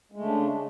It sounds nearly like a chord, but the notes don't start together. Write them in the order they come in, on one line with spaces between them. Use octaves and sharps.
G#3 A3 C#3 D4